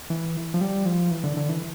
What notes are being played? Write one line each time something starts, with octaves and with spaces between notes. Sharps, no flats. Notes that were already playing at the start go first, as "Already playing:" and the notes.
E3
F3
G3
F3
E3
D3
D3
E3